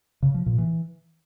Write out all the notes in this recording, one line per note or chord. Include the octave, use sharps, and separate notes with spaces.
C#3
F3
A#2
E3